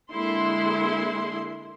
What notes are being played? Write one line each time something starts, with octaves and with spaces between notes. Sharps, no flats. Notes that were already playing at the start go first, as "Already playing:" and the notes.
D3 G#3 A#3 E4 C6